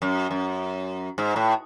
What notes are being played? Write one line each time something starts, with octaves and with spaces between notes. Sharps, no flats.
F#2
F#2
G#2
A2